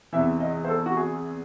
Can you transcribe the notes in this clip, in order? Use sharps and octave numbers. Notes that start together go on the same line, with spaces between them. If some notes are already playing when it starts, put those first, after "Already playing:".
E2 C3 E3 E5
D#5
C5
A4
F#4
G#4